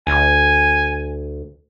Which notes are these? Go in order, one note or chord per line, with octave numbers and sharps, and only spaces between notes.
D2 G#5